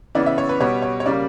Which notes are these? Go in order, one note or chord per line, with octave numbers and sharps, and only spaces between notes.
C#3 E3 B3 D5
E5
C#5
B4
B2 G3 B3 C#5
C#5
C#5
C#3 G3 A#3 D5